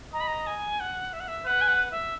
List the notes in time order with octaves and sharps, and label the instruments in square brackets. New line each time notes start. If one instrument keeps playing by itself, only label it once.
[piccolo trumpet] D#5 [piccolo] A#5
[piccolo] B5
A#5
G#5
F#5
E5
F#5
E5
[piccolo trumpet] B4 [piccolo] F#5
[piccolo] G#5
F#5
E5